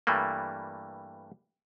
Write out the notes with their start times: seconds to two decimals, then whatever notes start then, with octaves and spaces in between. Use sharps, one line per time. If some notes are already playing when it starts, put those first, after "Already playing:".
0.07 G2 E3 G3 A3 A#3